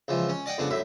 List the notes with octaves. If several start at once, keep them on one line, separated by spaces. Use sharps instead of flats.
C#2 E3 F3
C#4
D5 D#5 F#5 G5
F2 C#3 B3 D4
F#2 A2 E5